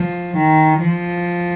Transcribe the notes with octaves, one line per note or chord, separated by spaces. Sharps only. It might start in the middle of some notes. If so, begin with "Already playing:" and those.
Already playing: F3
D#3
F3